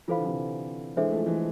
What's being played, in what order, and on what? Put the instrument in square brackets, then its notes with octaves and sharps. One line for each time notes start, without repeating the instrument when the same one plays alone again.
[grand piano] E3 [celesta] F4 A4 C5 F5 B5
[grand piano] D3
C3 E3
[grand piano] E3 G#3 [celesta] D4 A4 C5 E5
[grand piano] F3 A3
E3 G#3